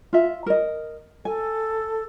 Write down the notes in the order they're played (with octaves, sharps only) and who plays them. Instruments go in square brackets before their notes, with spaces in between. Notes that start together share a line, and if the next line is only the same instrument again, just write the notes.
[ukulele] F4 E5
A#4 D#5
[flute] A4 [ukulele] G#5